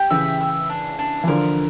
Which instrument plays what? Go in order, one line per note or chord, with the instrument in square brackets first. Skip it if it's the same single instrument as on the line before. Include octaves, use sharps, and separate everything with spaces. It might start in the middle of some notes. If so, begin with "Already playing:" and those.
Already playing: [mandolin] G4
[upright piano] C#3 E3 [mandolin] E5
[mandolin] E5
D4
D4
[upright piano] E3
[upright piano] D3 F3 [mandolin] A#4